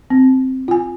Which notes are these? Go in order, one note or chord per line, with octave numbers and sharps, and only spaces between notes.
C4
F4 G#5